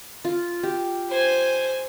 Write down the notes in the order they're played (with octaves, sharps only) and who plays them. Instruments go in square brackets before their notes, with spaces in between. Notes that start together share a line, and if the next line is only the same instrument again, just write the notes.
[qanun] F4
G4
[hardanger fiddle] C5 G#5